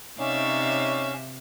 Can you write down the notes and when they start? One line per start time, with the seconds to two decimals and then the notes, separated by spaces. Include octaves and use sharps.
0.19 C3 C#4 D#4 C#5 D5 E5 F5